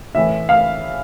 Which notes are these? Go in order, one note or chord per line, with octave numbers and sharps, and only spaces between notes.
A2 E3 E5
F5